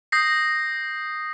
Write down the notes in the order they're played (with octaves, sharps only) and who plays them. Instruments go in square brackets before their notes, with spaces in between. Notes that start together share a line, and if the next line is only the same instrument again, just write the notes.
[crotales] D#6 G6 A#6 C7